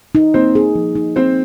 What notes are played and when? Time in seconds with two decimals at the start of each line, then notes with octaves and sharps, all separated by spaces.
0.15 D#4
0.34 A#3 C4 C5
0.55 G#4
0.75 F3
0.95 D#4
1.16 A#3 C4 C5